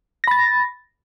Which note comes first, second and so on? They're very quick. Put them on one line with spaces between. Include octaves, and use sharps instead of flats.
A#6 B5 A6